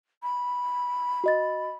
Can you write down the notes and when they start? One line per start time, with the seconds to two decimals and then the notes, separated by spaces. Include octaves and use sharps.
0.23 B5
1.24 F#4 D#5 A6